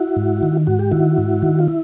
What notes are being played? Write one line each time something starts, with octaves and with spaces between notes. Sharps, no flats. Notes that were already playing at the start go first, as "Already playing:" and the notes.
Already playing: E4 F#4
G#2
D#3
G#2 F#4
G4
D#3 E4 F#4
G#2
D#3
F4
E4